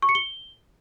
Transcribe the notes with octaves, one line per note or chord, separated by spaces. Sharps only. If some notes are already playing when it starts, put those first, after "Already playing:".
C#6
C#7
G7